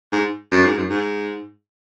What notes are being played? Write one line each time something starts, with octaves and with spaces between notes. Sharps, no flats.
G#2
F#2
G#2
F#2
G#2